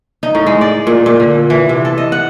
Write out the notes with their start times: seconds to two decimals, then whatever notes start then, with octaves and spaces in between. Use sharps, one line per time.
0.23 D#4
0.35 A2
0.46 G#3
0.61 D5
0.87 A#2
1.06 A#2
1.20 D3
1.50 E3
1.69 C3
1.85 A4
1.98 D#5
2.12 F#5